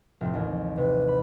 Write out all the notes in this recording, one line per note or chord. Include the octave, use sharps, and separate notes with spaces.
F1 A2 C4
A1 D#2
C3 B4
B5